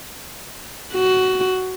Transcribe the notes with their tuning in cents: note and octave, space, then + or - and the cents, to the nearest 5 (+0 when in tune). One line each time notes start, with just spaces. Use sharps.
F#4 +15